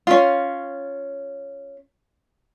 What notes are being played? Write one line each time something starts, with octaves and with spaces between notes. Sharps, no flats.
C#4 F4